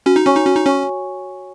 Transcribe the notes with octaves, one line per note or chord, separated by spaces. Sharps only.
C#4 F#4
D#4
C#4 C#5 G#5 C#6
D#4
C#4 F#4
D#4
C#4 C#5 G#5 C#6